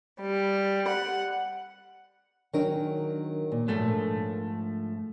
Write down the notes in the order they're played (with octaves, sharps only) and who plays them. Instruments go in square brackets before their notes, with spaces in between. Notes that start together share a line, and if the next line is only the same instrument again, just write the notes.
[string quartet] G3
F#5
[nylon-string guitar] D#3 F#3 G#4 [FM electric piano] D4 A#4 C#5
[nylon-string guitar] A#2
[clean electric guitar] G#2 A3 [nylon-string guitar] F3 A4